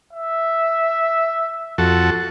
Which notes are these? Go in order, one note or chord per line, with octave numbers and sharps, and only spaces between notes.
E5
F2 F#4 A4